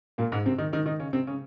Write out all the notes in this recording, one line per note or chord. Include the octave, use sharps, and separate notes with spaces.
A#2 A#3
G#2 G#3
C3 C4
D#3 D#4
D#3 D#4
D#3 D#4
C#3 C#4
C3 C4
C#3 C#4